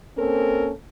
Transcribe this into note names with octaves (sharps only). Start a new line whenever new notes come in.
A#3 C4 C#4 A4 A#4